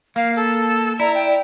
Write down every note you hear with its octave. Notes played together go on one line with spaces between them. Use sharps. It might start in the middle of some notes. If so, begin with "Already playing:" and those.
A#3 F5
A4
E4 D5 A#5
G5